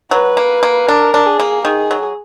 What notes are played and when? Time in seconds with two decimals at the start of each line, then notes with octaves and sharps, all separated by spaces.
0.11 F#3 B4
0.37 A#3
0.63 A#3
0.88 D4 A#4
1.14 D4
1.26 G#4
1.40 A#3
1.65 D#3 G#4
1.91 F#3